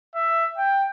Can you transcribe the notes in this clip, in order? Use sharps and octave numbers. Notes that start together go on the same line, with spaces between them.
E5
G5